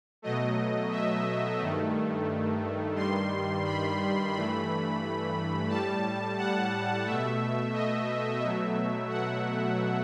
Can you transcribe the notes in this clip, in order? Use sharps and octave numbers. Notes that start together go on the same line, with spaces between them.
B2 F#3 A3 D#5
E5
G2 D#3 A3
G2 D#3 G3 C6
B5
G2 E3 A3 B5
A2 G3 A5
F#5
B2 A3 E5
D#5
B2 F#3 A3 E5
F#5